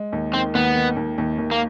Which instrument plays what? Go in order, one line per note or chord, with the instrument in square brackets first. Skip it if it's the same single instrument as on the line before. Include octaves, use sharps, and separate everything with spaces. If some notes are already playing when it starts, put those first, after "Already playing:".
Already playing: [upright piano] G#3
D#2
[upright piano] D#3 [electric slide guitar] C4
[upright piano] D#2 [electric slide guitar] B3
[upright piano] D#3
D#2
D#2
D#2
[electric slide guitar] A#3